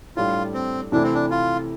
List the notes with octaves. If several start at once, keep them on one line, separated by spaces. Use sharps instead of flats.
A2 G3 D4 F4
C4
C3 E3 A3 D4 E4
C4
D4
F4